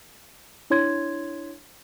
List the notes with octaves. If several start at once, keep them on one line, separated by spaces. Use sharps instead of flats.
D4 E4 C#5 C6 G#6